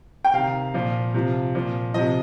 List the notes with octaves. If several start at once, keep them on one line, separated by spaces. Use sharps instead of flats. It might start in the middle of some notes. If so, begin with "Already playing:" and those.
G5
C3 D#3 F5
A#2 F3
C3 F3
A#2 F3
C3 F3 D#5